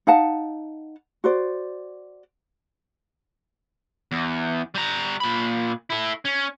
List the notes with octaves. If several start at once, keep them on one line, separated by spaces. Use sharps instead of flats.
D#4 F5 F#5 A5
F#4 C5 D5
E2
G3 A#5
A#2 B5
E4 A4
C#4